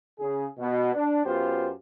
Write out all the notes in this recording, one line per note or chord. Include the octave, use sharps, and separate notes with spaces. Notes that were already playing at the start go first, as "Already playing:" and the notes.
C#3 G#4
B2
D4
F#2 B3 F4 G4 C5